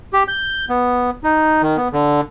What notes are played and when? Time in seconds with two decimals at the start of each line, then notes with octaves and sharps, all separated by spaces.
0.13 G4
0.28 G6
0.69 B3
1.24 D#4
1.62 D#3
1.77 B3
1.93 D3